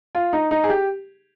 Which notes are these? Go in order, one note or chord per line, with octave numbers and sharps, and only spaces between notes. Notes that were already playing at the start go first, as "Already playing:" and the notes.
F4
D#4
D#4
G#4
G4